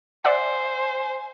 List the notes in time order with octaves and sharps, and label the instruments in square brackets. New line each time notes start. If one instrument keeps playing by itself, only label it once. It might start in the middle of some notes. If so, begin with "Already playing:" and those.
[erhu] C5 [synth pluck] D5 E5 F#5 [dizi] G#5